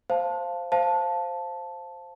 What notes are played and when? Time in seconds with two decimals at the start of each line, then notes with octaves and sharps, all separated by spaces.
0.10 C5 F5 A5
0.72 C5 F5 A5